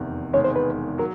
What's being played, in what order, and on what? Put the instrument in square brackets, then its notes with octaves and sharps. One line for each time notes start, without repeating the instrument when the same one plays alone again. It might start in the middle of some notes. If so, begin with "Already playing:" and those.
Already playing: [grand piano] F1 E2 C3 D#3
[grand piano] E1 E2 C3 D#3 G#3 [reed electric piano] C#5
[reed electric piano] C5
B4
[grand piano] F#3 [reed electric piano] A#4